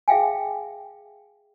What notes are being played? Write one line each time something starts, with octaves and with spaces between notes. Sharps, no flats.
G#4 E5 F5 G5 G#5